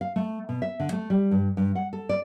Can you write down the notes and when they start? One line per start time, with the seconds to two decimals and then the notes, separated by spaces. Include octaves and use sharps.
0.01 F5
0.16 A3
0.49 B2
0.62 E5
0.80 D3
0.92 A3
1.10 G3
1.31 G2
1.57 G2
1.75 F#5
1.93 A4
2.09 D5